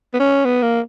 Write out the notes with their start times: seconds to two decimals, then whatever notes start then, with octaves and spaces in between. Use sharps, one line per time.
0.14 B3
0.20 C#4
0.45 B3
0.62 A#3